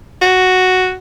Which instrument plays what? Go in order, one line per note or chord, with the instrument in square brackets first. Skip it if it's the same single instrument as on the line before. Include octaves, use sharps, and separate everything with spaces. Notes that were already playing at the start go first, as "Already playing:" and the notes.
[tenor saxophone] F#4